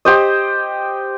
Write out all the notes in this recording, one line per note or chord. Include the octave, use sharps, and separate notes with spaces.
G4 C5 D#5